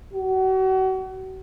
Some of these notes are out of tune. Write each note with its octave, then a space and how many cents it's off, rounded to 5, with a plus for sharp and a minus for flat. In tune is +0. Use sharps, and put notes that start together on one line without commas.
F#4 +35